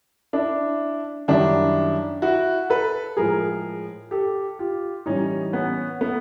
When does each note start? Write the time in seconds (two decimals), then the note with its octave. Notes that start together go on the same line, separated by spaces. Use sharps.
0.33 D4 E4
1.28 F#2 D#3 G3 D4 E4
2.22 E4 F#4
2.70 A4 B4
3.17 A2 F3 G#3 G#4 A#4
4.11 G4 A4
4.59 F4 G4
5.06 A2 E3 G3 C#4 D#4
5.53 B3 C#4
6.01 A3 B3